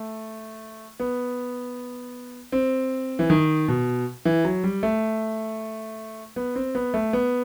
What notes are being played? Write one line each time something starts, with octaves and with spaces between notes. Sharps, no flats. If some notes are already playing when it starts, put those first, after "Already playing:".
Already playing: A3
B3
C4
E3
D#3
B2
E3
F#3
G3
A3
B3
C4
B3
A3
B3